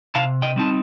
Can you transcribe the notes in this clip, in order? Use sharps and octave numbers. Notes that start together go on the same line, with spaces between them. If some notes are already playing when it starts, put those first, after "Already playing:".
C3 F5 A5
D#5 G5
G3 C4 D#4 A5